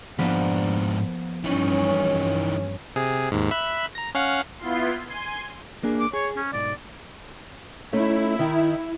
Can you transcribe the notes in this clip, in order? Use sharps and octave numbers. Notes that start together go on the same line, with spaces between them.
G#2 F3 A#3 B3 D4
G2 E3 C#4 D#4
C3 G#4
D#2 G#2
E5 B5 F#6
A#5 A#6
C#4 F5 F#5
B3 E4 F4 C6
G#5 C6
A#3 D4 G#4
D6
G#4 C#5
C#4
B1 G#2 D5
A3 C#4 D#4 E4
D#3 D#4